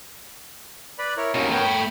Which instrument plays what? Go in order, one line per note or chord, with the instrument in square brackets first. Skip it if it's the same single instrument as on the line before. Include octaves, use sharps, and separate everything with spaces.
[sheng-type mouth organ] B4 D5 B5
E4 A#4 C#5
[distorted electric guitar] D#2 B2 [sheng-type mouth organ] C#4 A#4
[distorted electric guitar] A3 G5 [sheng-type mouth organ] B3 A#4 C#5
[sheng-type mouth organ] B5